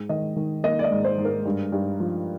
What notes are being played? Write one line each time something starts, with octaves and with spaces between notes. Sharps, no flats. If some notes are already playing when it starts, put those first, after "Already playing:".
Already playing: G#2
D#3 D#5
D#3
A#3 D#5
D5
D#5
G#2
C5
G#2
A#4
G2
G2
F3